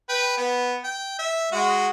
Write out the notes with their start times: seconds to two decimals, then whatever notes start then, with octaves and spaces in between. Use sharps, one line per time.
0.09 B4 G5
0.37 B3
0.84 G5
1.19 E5
1.52 G#3 F#4